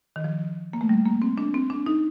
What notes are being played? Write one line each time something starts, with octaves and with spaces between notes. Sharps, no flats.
D#3
F3
A#3
A3
G3
A#3
C4
D4
C4
D4
D#4